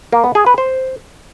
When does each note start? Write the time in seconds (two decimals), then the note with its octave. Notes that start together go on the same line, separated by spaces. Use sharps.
0.13 A#3
0.24 B3
0.35 G#4
0.46 B4
0.58 C5